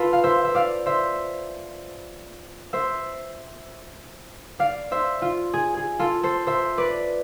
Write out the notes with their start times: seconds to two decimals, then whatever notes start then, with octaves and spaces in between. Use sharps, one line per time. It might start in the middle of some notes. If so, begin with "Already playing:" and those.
Already playing: F4 A4 B4
0.13 F5
0.24 C5 E5
0.45 E5
0.54 D5 F5
0.86 C5 E5
2.73 C5 E5
4.59 D5 F5
4.91 C5 E5
5.22 F4
5.54 G#4
5.77 G#4
5.99 F4 A4
6.23 A4 C5
6.47 C5 E5
6.77 B4 D5